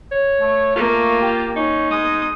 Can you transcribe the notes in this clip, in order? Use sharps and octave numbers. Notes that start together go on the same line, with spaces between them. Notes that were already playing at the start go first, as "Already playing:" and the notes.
C#5
A3
A#3 F4
G4
C#4 D#4
G#3 D#6